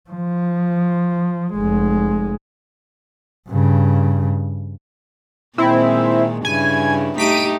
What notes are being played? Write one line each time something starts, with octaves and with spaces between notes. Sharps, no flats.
F3
F1 G#3
G2 C#3
A#2 D#3 G#3 C4 E4
G2 C#3 E4 G#5
A3 D#4 G4 B6 D7 D#7